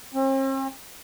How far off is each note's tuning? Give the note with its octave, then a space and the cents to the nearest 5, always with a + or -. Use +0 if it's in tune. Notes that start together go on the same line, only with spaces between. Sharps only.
C4 +45